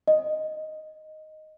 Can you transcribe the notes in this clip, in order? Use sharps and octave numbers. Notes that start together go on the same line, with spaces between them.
D#5